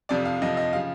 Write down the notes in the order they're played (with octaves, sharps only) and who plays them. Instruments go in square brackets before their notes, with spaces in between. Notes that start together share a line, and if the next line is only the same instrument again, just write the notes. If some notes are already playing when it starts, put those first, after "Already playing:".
[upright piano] F2 C3 F3 D5
F5
F2 C3 F3 D#5
D#5
C#3 F3 F5